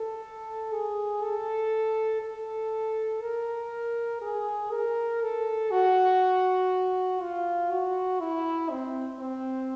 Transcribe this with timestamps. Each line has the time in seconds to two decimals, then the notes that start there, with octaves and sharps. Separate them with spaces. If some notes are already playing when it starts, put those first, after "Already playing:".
Already playing: A4
0.72 G#4
1.22 A4
2.22 A4
3.21 A#4
4.21 G#4
4.71 A#4
5.22 A4
5.71 F#4
7.21 F4
7.71 F#4
8.20 E4
8.70 C4
9.20 C4